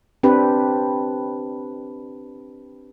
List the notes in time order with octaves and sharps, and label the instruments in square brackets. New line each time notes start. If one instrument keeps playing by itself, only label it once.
[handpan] C4 D4 G4 B4